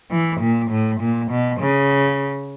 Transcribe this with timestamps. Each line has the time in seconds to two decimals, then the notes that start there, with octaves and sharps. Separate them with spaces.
0.11 E3
0.40 A#2
0.70 A2
1.00 A#2
1.30 B2
1.60 C#3